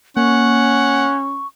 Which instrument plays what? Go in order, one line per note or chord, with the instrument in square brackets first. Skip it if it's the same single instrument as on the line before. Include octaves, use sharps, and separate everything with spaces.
[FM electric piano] A#3 [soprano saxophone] C#4 [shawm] F#5 [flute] C#6